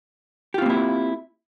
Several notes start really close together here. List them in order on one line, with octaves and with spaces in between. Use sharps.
G4 F4 C4 A#3 E4